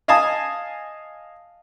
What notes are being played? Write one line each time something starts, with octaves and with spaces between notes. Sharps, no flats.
D#5 F5 G#5 A5 D#6